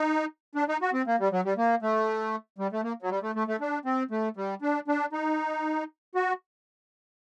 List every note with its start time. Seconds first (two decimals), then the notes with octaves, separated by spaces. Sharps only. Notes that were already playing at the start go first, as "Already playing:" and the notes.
Already playing: D#4
0.55 D4
0.68 D#4
0.82 F#4
0.93 C4
1.07 A#3
1.19 G3
1.32 F#3
1.45 G3
1.57 A#3
1.82 A3
2.58 G3
2.72 A3
2.84 A#3
3.02 F#3
3.10 G3
3.23 A3
3.35 A3
3.48 A3
3.61 D4
3.85 C4
4.11 A3
4.37 G3
4.62 D4
4.88 D4
5.13 D#4
6.15 F#4